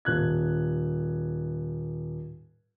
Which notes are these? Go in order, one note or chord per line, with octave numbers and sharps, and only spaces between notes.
D#1 F#6 G#6